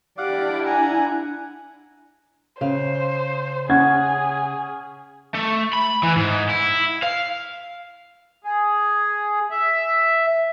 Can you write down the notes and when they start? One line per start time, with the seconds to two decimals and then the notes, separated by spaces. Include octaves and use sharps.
0.18 D4 E4 G4 D5 F5 F#5 D6
0.66 F#5 G#5 A#5
2.61 C#3 C5 F5
3.69 C#4 G#4 F#5 G#6
5.34 A3
5.73 B5
6.03 E3
6.16 G#2
6.49 E4
7.03 F5
8.44 G#4
9.50 E5